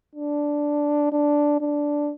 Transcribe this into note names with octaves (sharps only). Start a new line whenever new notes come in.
D4
D4
D4